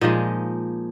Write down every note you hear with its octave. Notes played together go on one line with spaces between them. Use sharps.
A#2 F3 G#3 D#4